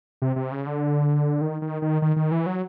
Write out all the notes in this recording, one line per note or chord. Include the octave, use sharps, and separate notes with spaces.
C3
C3
C#3
D3
D#3
D#3
D#3
D#3
D#3
E3
F#3